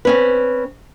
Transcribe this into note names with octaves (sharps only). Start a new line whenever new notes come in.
C4 C#4 B4